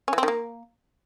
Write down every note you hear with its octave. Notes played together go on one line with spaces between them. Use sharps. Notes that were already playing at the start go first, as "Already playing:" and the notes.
C#4
E3
C4
D#3
A#3